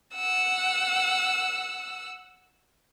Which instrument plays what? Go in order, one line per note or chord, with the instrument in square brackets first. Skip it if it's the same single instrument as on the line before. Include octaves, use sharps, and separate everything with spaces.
[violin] F#5 E6